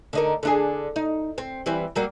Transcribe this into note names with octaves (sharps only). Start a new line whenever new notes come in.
D3 D#4 A#4
D3 D4 G#4
D#4
C4
E3 G3 C4
F#3 G3 A#3